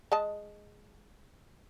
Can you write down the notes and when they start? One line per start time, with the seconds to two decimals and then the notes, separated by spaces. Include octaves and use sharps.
0.12 G#3 D#5 A5